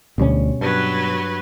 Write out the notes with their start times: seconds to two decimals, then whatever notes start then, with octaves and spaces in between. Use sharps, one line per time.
0.18 D1 D2 B2 G3 C#4
0.61 G2 F#3 B4